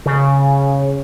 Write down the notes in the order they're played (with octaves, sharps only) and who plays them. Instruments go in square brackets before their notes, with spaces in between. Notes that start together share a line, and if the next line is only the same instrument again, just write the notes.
[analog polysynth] C#3